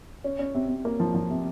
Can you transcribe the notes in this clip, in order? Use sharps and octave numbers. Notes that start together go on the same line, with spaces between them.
C#4
C#4
C3
C3
A#3
F3
F3
C3